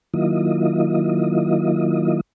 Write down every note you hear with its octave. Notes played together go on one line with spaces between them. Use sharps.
D#3 F#3 A#3 E4 F4 D#5